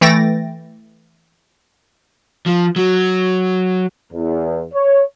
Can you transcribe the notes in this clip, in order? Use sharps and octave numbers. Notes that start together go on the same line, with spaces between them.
E3 A3 G5 A6 A#6
F3
F#3
E2
C#5